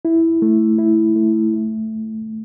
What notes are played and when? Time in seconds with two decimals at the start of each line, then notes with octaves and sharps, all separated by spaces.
0.05 E4
0.42 A3
0.78 E4
1.16 A3
1.54 A3